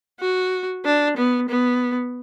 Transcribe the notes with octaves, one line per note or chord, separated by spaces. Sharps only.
F#4
D4
B3
B3